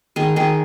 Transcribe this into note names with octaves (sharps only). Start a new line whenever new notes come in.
D#3 G#4
D#3 G#4